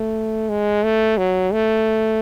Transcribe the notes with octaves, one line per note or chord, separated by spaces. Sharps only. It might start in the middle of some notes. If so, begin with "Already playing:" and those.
Already playing: A3
G#3
A3
F#3
A3